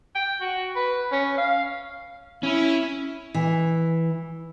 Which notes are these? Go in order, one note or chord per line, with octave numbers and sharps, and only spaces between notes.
G5
F#4
B4
C#4
F5
C#4 E4
E3